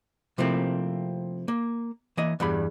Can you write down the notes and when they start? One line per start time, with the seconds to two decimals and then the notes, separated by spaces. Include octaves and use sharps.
0.38 C3 F3 A3 A#3 C4 E4
1.48 A#3
2.17 E3 A#3 D#5
2.40 E2 G2 G3 B5